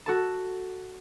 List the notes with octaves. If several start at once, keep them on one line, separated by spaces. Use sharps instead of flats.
F#4 A4 A5